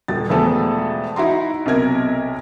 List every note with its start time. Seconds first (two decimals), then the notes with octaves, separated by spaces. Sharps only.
0.08 D#1 A6
0.29 E1 E2 E3 F3 A3 A4
1.16 D#4 E4 F#4 A#5 C6
1.66 B1 C3 A#4 G#6